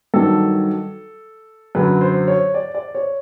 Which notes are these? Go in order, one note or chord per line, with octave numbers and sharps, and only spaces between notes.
G2 D#3 F#3 A4
F#2 D3 F#3 B4
C5
C#5
D5
D5
C#5